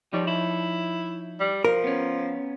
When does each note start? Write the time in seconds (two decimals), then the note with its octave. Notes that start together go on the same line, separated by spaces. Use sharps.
0.13 F3 G3 D#4 C#5
0.27 E4
1.40 G3
1.65 F3 A#4
1.84 B3 C#4